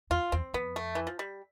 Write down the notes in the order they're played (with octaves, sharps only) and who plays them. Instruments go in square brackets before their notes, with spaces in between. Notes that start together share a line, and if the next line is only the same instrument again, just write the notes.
[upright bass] E2 [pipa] F4
[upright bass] E2 [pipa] C4
[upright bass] F2 [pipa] B3
[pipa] A3
E3
F3
G3